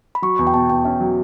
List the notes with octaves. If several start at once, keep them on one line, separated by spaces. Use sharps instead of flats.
B5
F#3 C#6
E2 C#6
G5
B2 A5
E2 G5
C#4 E5
F#3